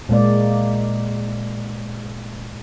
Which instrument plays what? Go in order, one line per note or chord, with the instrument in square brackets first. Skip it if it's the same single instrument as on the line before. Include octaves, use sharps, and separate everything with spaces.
[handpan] A#2 G#3 A#3 D5